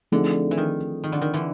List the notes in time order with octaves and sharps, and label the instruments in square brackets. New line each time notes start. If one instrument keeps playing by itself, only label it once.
[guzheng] D3 [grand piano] F3 A3 C4 D#4 G#4
[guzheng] E3
D#3
D#3
D3
D#3
D3 E3